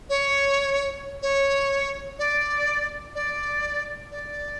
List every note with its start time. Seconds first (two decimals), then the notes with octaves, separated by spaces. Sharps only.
0.09 C#5
1.22 C#5
2.19 D5
3.15 D5
4.11 D5